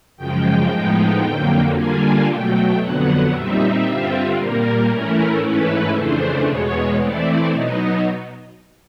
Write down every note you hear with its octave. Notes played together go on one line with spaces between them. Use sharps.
F#2 C#3 F3 G#3 G5
A2 F3 G#3 B3 D#4
F2 D3 F#3 A#3
D3 G3 A#3 D4 F4 G#5
B2 F#3 A3 G5
F2 D3 F#3 B3 F#5
A#2 G3 C4 D#4 E5
G2 D3 G3 C4 F4
A#2 G3 A#3 A#4
A2 E3 A3 C#4 E4 A#4
G#2 E3 A3 C#4 E4 B4
F2 C#3 E3 A3 D4 C5
E2 B2 G#3 B3 C#5
E3 A3 C4 E4 D5
B2 F#3 B3 D#4 D#5